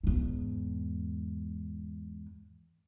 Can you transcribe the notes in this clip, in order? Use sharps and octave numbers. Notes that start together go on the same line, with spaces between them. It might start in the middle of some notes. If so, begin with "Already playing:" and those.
E2 G#2